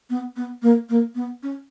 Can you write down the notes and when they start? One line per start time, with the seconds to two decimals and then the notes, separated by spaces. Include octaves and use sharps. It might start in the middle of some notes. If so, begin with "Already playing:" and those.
0.10 B3
0.36 B3
0.62 A#3
0.90 A#3
1.15 B3
1.43 C#4